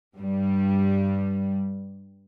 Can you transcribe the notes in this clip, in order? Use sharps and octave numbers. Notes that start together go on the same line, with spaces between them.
G2 G3